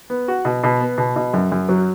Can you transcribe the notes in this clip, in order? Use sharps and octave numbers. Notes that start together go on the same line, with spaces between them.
B3
F#4
B2
B2
B3
B2
B2
F#2
F#2
F#3